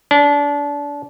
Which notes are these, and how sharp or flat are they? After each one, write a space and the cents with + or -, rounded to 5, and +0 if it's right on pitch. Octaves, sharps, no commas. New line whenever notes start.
D4 -25